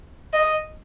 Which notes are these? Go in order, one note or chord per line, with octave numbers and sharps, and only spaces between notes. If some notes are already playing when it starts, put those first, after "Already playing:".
D#5